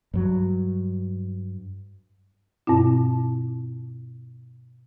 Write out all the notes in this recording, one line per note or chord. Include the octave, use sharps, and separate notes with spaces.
G2 F#3
G2 B2 C4 E4